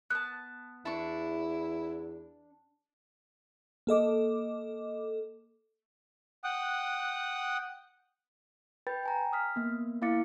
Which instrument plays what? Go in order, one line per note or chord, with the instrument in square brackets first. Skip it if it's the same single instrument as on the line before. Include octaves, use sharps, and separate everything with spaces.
[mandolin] B3 A5 [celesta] F#6
[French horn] E2 [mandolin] D4 C#6 [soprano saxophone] E4
[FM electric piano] A#3 A4 D#5 D6
[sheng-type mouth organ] F#5 G5 D#6 F#6
[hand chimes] B4 G5 B5 G6 A6
G5 G#5 A#5
D#6 F6 B6
A#3 B3
A#3 E4 F5 D6 A6 C#7